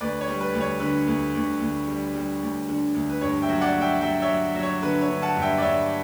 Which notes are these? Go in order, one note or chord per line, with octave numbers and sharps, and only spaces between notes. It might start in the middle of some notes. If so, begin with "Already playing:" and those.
D2 B4 D5
C#5
G3
B4
D2
C#5
D3 B4
D2
D2
D2
G3
G3
D2
D3
D2
B4
G2 C#5
E5 G5
F#3
D5 F#5
F#3
E5 G5
F#3 E5 G5
C#5 E5
F#3
F#3
C#5
D3 B4
C#5
D3
F#5 A5
G2
E5 G5
D5
G2 C#5 E5